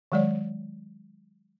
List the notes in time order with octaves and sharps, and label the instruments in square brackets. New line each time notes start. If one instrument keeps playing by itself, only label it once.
[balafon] D#3 F#3 G#3 C#5 D5